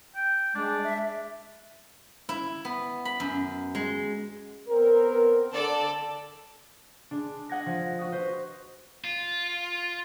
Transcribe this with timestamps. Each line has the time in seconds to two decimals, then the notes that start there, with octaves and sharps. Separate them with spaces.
0.15 G5
0.55 G#3 D4
0.84 E5
2.29 E4
2.65 B3
3.05 B5
3.20 F#2
3.75 G#3
4.68 B3 C4 A#4
5.53 D3 A4 D5
7.11 G#3 D4
7.49 D#5 F#5 G#6 A#6
7.66 F3
7.99 F#4 D#6
8.12 B4 C5 D#5
9.04 F4